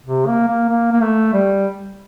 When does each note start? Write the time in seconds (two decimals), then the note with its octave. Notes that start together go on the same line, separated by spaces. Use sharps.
0.06 C3
0.27 A#3
0.48 A#3
0.70 A#3
0.92 A#3
1.01 A3
1.33 G3